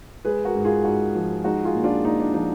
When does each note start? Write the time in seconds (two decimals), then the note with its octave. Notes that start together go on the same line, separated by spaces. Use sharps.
0.25 G#3 G#4 B4
0.45 F#4 A#4
0.55 G#2
0.65 F4 G#4
0.84 G#2 D#4 F#4
1.15 F3
1.44 G#3 D#4 F#4
1.64 F4 G#4
1.75 A#2
1.84 D4 F4
2.04 A#2 D#4
2.19 D4
2.34 F3 D#4